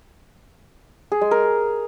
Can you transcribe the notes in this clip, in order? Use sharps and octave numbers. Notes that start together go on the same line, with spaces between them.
G#4
G#3
A#4